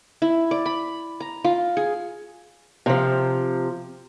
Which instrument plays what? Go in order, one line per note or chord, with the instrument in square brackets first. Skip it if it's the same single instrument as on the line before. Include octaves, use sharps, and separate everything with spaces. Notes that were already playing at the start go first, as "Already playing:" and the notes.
[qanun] E4
D5
B5
A#5
F4
G#4
[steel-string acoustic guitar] C3 F3